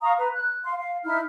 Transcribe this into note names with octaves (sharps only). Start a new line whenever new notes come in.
F5 A#5 C#6 D#6
B4 A#5
F#6
F5 C6
F5
D#4 E4 E5 F6